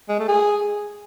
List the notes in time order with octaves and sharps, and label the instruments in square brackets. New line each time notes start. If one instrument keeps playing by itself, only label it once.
[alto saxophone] G#3
A3
G#4